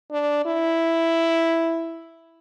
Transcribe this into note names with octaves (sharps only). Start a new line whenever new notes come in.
D4
E4